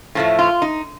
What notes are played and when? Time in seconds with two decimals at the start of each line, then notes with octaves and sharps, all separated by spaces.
0.15 A2 F3 A3
0.39 F4
0.62 D#4